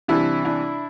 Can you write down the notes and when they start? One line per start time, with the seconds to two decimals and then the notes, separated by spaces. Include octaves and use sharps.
0.08 C3 E3 G3 D4 E4
0.45 D4 E4